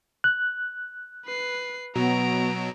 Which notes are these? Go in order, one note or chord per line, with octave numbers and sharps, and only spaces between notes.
F#6
B4 C7
B2 F#3 B3 A#5 D7